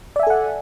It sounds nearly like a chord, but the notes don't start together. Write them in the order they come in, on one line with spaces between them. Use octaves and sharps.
D5 E5 G#5 A4 F#5